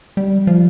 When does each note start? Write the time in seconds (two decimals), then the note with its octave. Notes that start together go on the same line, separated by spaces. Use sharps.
0.17 G3
0.47 F3